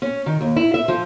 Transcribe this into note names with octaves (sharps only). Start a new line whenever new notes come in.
C#4
D#3
D#2
E4
E5
F3